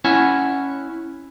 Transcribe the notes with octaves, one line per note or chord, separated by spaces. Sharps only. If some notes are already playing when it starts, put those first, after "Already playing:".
C#4 E4 F#5 G#5